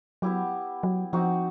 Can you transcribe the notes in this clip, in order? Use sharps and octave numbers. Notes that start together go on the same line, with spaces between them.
F#3 B3 E4 G4
F#3
F3 C4 D#4 F#4